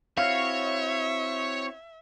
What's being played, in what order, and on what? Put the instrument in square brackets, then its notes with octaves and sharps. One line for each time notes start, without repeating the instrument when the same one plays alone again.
[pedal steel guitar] C4 E4 F#4 [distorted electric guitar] C#5 [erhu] E5 [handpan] F5